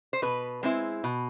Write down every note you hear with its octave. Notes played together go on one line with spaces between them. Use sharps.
C5
B2 B4
G#3 C4 E4
B2